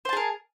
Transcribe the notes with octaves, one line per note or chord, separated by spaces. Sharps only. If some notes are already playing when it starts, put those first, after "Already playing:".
G#4 A#4 C5 A5